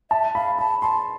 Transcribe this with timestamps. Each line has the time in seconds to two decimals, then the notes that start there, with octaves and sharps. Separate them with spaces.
0.11 E5 A5
0.34 F5 B5
0.59 A5 B5
0.82 A5 C6